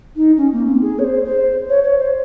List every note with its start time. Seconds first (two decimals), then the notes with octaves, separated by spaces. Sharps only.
0.16 D#4
0.37 C#4
0.52 A#3
0.67 C4
0.82 G#4
0.99 C#5
1.04 C5
1.25 C5
1.69 C#5
1.84 C#5
1.98 C5